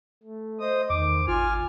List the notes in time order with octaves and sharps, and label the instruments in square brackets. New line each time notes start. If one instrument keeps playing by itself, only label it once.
[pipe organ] A3
C5 D#5 D#6
[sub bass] E2 [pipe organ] D#3 [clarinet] D6
[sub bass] G#1 [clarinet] F4 [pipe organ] G#5 F6